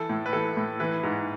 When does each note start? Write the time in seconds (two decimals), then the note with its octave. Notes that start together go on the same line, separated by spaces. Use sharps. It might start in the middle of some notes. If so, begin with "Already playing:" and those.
Already playing: E3 A4
0.09 A2
0.26 B4
0.33 E3 A4
0.57 A2
0.80 E3 B4
1.03 G#2